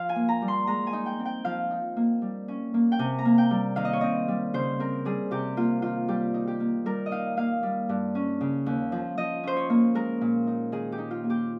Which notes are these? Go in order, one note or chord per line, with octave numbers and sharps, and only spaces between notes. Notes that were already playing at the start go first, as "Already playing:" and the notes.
Already playing: F3 F5
G#5
A#3
A#5
G3
C6
G#3 A#5
G#5
D#4
G5
C4
G5
F3 F5
D#4
A#3
G3
C#4
A#3
G5
C3 G#5
A#5
A#3
G5
G3
D#3 F5
D#5
C#5
C4 D#5
G3
C#3 C5
C4 A#4
G3 G#4
C3 G4
A#3 F4
D#3 F4
G3 G4
D#4
G4
A#3
G3 A#4
D#5
D#4 F5
A#3 F5
G3
G2
C#4
C#3
D#2
F3
F3 D#5
C#4 C5
C#5
A#3
G#3 A#4
A#2
D#4
D#3 G#4
G4
D#4
F4
A#3
G4